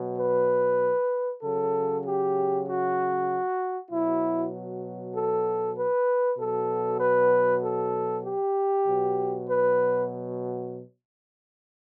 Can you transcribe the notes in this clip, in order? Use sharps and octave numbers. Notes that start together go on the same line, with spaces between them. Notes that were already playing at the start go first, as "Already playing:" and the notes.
Already playing: B2 F#3
B4
C#3 F#3 A4
G4
F#4
B2 F#3 E4
A4
B4
B2 F#3 A4
B4
A4
G4
B2 F#3
B4